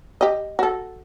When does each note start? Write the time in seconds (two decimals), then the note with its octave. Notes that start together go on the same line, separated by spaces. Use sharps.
0.21 G4 D#5
0.59 F#4 A4